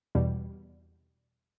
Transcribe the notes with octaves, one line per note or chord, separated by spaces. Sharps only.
E2 B2 G3